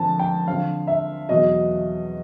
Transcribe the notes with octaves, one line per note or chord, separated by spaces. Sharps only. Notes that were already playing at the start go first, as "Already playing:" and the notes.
Already playing: F2 D3 F3 A5
G5
F2 D3 F3 F5
E5
E2 B2 F#3 D#5